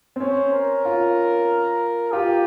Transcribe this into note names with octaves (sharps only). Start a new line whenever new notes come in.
C4
C#4 C5
A#4
F4
F4 G4